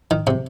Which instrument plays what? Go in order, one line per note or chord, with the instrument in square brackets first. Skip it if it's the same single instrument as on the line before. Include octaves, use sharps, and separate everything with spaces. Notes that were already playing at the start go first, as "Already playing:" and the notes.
[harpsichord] D#3
C3